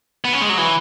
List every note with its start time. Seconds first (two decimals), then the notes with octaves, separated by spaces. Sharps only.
0.25 B3
0.33 C#4
0.41 G#3
0.50 F#3
0.58 E3